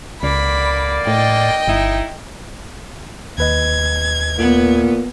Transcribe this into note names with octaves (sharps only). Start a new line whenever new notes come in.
C#2 D3 A#3 D5 B5
A2 D#5 G5
G1 D#4 E4
D#2 B4 D#5 G#6
A#2 B3